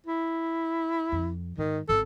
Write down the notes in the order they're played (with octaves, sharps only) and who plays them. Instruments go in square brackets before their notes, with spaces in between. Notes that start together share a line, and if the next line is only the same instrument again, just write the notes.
[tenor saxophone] E4
[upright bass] F2
[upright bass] G#2 [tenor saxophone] D#3
[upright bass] G#1 C#3 [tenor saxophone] A4